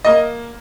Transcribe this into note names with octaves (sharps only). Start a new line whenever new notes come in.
A#3 D#5